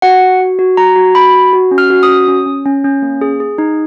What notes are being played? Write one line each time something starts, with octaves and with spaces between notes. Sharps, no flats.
F#4 F#5
F#4
F#4
F#4
F#4 A#5
F#4
F#4 B5
F#4
F#4
C#4
F6
F#4
D#6
C#4
C#4
C#4
C#4
C#4
A#3
G#4
G#4
D#4